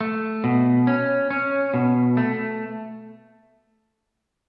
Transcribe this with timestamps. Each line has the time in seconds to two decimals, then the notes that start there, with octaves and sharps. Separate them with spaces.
0.01 A3
0.44 B2
0.87 C#4
1.30 C#4
1.74 B2
2.17 A3